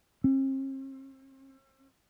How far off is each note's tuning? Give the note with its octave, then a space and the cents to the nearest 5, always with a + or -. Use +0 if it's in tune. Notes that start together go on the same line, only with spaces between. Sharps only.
C4 +45